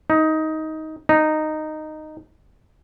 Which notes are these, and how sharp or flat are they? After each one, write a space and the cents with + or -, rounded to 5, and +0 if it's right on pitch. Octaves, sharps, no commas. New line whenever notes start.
D#4 +15
D#4 -10